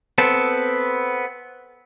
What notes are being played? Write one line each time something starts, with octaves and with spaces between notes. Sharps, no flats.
B3 C4 A4